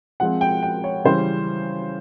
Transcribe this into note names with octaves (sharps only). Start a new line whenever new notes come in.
F3 G#3 C4 F#5
G5
G5
C#5
C#3 E3 G3 C5